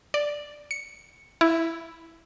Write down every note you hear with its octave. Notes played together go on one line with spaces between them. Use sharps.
D5
C#7
E4